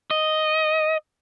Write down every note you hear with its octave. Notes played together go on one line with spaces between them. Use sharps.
D#5